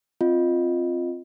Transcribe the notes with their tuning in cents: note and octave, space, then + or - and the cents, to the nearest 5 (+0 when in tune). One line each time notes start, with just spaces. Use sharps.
C4 +0 F4 +0 D#5 +0